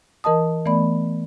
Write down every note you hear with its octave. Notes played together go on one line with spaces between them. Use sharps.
E3 A#4 D#5 A5 D#6
E3 A3 B3 D5 B5